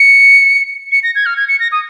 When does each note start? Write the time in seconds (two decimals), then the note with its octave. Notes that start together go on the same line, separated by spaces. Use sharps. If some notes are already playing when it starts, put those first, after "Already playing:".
Already playing: C#7
0.92 C#7
1.03 A#6
1.15 G#6
1.26 F6
1.37 G#6
1.48 C#7
1.60 A#6
1.72 D#6